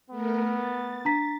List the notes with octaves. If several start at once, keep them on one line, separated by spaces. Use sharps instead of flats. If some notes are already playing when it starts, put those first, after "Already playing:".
A3 B3 A#4
A6
D4 A#5 B6